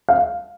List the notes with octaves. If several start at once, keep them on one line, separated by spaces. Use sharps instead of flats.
F5